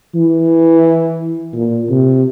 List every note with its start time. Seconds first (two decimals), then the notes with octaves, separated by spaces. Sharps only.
0.15 E3
1.54 A#2
1.90 C3